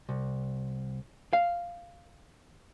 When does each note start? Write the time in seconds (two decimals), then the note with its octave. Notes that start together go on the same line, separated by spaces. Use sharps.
0.09 C2
1.33 F5